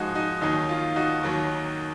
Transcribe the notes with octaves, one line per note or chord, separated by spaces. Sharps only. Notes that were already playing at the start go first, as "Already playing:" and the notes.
Already playing: G#2 F3 G#3 D#4 F#4 G#4
D#4 F#4
D#2 D#3 F#3 D#4
F4
D#4 F#4
D#2 D#3 F#3